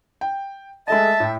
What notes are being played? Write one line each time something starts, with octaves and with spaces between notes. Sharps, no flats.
G5
G#3 A3 D#5 E5 A5
A2 G5